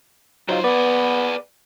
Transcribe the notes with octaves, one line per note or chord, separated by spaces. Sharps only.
F#2 F#3 D#4 F4 C5
B3 G#4 B4 D5